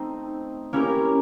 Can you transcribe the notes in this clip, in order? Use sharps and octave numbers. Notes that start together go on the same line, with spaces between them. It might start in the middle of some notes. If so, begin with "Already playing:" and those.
Already playing: A3 C4 D#4
A#3 C#4 E4 G4 A#4